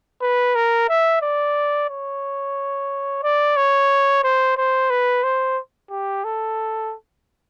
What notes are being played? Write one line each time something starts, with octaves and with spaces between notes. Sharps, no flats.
B4
A#4
E5
D5
C#5
D5
C#5
C5
C5
B4
C5
G4
A4